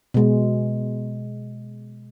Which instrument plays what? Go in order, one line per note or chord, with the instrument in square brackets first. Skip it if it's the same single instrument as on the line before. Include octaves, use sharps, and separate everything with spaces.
[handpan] B2 G#3